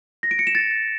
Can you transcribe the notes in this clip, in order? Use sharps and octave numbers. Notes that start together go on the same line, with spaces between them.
A#6
D7
C#7
E7
A6